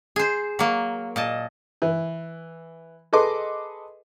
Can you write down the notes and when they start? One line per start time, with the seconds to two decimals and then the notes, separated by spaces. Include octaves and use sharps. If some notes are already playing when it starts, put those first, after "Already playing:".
0.16 G#4 C5
0.59 F#3 A#3
1.16 A#2 D#5 A5
1.82 E3
3.13 G#4 A4 B4 D#5 C6 D6